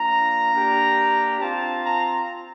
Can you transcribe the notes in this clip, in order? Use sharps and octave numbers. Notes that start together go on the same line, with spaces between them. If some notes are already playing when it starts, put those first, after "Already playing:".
Already playing: A#3 D4 F4 A#5
A#3 D4 G4
C4 F4 A5
A#5